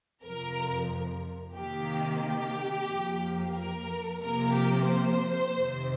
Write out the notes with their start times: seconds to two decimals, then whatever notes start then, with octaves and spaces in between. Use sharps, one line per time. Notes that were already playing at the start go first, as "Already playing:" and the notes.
0.23 F2 C3 F3 A#4
1.55 C3 D#3 A#3 G4
2.22 G4
2.88 F2 F3 A#3
3.55 A#4
4.20 C3 F3 A#3 A#4
4.54 G4
4.87 C5
5.53 F2 C3 D#3